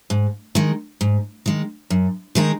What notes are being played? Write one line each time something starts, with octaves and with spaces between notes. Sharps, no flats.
G#2
D#3 G#3
G#2
D#3 G#3
F#2
D#3 G#3 D#4 A#4